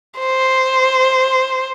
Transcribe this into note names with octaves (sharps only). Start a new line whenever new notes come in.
C5